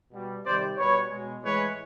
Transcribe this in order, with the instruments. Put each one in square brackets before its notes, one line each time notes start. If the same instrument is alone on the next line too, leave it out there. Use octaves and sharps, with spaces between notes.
[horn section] B2 G3
C3 D#3 G3 C5 D5
B2 G3 B4 C#5
B2 G#3
A2 E3 G#3 B4 C#5